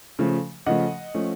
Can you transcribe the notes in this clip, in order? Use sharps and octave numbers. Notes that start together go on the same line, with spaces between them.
C#3 F3 A3
C#3 F3 A3 D#5 F#5
F3 A3 C#4